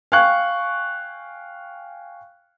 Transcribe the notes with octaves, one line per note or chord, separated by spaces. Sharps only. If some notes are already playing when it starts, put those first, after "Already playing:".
F5 G5 G#5 C#6 F#6